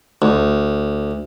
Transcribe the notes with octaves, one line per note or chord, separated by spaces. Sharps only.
D2